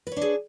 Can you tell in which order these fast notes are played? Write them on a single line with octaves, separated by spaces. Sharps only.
B4 C#5 D4 G#4